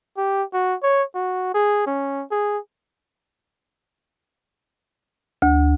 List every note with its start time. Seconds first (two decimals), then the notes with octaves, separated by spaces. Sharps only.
0.17 G4
0.54 F#4
0.83 C#5
1.15 F#4
1.54 G#4
1.87 C#4
2.31 G#4
5.42 D2